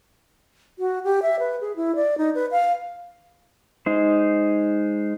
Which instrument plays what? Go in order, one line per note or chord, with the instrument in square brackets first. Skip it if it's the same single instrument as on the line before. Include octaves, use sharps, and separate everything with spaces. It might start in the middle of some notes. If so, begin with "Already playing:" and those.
[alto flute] F#4
G4
E5
B4
G#4
E4
D5
D#4
B4
F5
[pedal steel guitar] G#3 D#4 C5